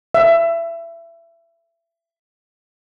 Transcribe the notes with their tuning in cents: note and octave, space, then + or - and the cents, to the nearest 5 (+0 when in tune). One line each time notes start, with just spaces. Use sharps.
E5 +25